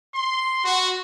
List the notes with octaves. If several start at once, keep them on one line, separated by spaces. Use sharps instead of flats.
C6
F#4